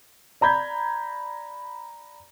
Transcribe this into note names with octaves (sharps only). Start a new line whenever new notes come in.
D5 A#5 B5 G6 G#6